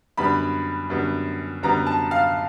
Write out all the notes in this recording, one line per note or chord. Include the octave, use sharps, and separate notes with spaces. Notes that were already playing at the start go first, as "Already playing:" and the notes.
F#2 D3 G3 B3 B5
F#2 D3 G3 B3
F#2 D3 G3 B3 A#5
A5
F5